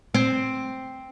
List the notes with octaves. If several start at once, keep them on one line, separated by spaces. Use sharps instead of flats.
C4